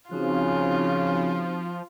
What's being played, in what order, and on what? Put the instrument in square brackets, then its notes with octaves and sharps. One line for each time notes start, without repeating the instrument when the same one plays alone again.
[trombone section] C#3 [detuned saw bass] F3 [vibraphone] C4 D#4 F#4 [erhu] F4